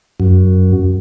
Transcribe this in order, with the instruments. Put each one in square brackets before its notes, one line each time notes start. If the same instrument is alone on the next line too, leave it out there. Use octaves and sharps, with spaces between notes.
[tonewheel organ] F#2